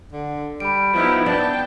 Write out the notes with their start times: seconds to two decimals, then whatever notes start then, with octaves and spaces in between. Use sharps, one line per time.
0.12 D3
0.60 G3 B5 D7
0.93 F3 B3 D#4 E4
1.26 B3 D4 G5 A5